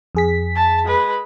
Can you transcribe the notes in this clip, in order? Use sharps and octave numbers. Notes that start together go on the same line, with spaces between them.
F2 G#4 B6
A5
G#3 B4